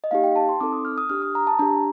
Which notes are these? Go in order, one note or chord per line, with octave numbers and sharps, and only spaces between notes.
D#5
A#3 D#4 G4 F5
G5
A5
C6
C4 D#4 A4 D6
D#6
F6
D#6
D4 G4 F6
D#6
A#5
A5
D4 G4 A#5